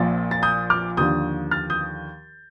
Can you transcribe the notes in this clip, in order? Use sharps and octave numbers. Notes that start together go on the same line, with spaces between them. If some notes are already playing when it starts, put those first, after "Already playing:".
Already playing: A#1 A#2 F3 A6
A6
D#6 G6
D6 F6
D#2 D3 F3 D#6 G6
F6 A6
D#6 G6